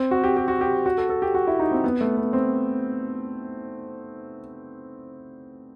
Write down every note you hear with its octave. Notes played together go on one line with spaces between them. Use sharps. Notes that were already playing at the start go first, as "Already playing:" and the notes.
Already playing: C4
F#4
G4
G4
F#4
G4
F#4
A4
A4
G4
F#4
E4
D#4
C4
B3
A3
B3
C4